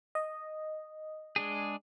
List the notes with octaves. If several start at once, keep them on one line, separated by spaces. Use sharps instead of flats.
D#5
G#3 D4 G#4